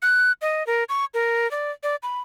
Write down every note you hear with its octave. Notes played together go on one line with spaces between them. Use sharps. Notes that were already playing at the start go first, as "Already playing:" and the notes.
F#6
D#5
A#4
C#6
A#4
D5
D5
B5